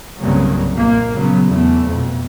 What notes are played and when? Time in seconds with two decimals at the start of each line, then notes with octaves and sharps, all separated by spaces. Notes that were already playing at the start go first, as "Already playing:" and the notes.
0.19 C2 G2 C#3 F#3 A#3
0.73 A#1 A#3
1.17 C#3 F#3 B3
1.48 E2 A3
1.88 F2 B2